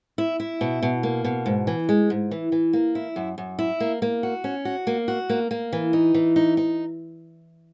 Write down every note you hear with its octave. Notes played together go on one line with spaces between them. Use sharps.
E4
E4
B2
B2
A#3
B2
G#2
E3
G#3
G#2
E3
E3
A#3
E4
F#2
F#2
E4
A#3
A#3
F#4
C#4
F#4
A#3
F#4
A#3
A#3
E3
D#4
E3
D#4
D#4